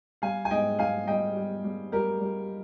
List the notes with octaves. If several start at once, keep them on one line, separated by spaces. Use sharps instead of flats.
G3 F5 G#5
G#5
G#2 D#5 G5
G#2 F5 G#5
G3 D#5 G5
G3
G3
G3 G4 A#4
G3